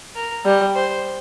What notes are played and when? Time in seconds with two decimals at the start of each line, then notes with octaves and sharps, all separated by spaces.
0.15 A#4
0.45 G3
0.75 C5